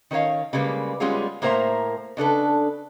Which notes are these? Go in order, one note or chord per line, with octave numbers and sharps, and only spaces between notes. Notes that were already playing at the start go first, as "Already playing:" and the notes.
D#3 C#4 A#4 C#5 F5
C#3 G3 G#3 A#3 B4
G3 G#3 B3 C#4 F4 G#4
A2 A#3 A#4 C5 E5 A#5
C#3 D4 A4 B4